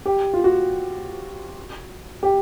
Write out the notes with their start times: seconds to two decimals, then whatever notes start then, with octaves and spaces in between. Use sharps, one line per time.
0.06 G4
0.33 F4
0.44 F#4
2.23 G4